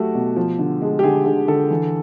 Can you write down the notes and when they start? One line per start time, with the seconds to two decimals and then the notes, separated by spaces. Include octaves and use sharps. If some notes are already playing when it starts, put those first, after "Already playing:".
Already playing: F#3 A3 F#4 G4
0.15 B2
0.36 F3
0.59 D3
0.82 G#3
0.99 G4
1.03 D3 G#4
1.26 D3 G#4
1.48 D3 A4
1.70 E3